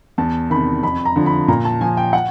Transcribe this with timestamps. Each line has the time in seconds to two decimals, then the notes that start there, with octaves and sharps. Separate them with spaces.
0.18 E2 A5
0.50 C3 D#3 B5
0.83 F2 B5
1.05 A#5
1.16 D3 F3
1.26 B5
1.48 A#2 A#5
1.65 A5
1.81 F3 G#5
1.97 G5
2.13 F#5